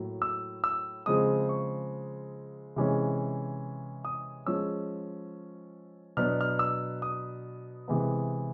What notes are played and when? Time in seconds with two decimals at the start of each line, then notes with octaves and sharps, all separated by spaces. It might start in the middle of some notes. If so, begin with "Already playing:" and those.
Already playing: A2 F#3 A#3
0.22 E6
0.64 E6
1.06 C#3 F3 G#3 C4 D#6
1.49 C#6
2.76 C3 E3 G#3 C#4
4.05 D#6
4.46 F3 G#3 C#4 E6
6.17 B2 F#3 B3 D4 F6
6.41 F6
6.59 E6
7.02 D#6
7.88 C3 E3 G#3 B3